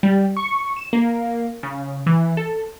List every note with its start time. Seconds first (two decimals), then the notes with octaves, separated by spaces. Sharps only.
0.03 G3
0.37 C#6
0.77 E7
0.93 A#3
1.63 C#3
2.06 E3
2.37 A4